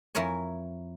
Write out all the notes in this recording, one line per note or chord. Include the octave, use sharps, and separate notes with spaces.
F2 E4 A#4 C#5 G#5